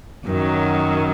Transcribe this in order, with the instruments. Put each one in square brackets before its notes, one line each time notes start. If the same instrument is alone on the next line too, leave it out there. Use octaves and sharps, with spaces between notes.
[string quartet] F#2 D#3 F#3